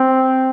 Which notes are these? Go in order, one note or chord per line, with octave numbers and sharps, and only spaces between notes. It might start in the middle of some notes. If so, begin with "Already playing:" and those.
Already playing: C4